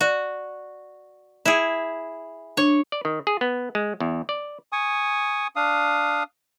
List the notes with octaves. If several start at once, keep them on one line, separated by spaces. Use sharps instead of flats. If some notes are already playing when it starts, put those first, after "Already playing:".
F#4 D5
E4 G#4
D4 C#5
D5
D#3
G#4
B3
G#3
E2
D5
G#5 C#6 D#6
D4 F5 D#6